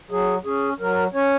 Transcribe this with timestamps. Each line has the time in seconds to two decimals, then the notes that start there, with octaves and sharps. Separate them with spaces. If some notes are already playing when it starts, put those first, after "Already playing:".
0.11 F#3 G#4
0.45 C#4 G#4
0.80 F#3 A#4
1.14 C#4 C#5